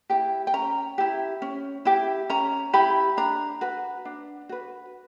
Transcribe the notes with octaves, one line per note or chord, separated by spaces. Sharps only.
E4 G4 G5
G5
C#4 A#5
E4 G4
C#4
E4 G4
C#4 A#5
E4 G4 B5
D4 A#5
F#4 B4
D4
F#4 B4